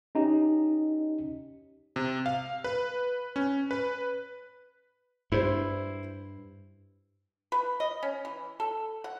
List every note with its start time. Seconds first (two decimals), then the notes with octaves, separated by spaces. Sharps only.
0.15 C#4 D#4 G4 D#5
1.96 C3
2.26 F5
2.64 B4
3.36 C#4
3.71 B4
5.32 G2 E4 C5
7.52 B4
7.80 D#5
8.03 C#4
8.25 E3
8.60 A4
9.04 F#5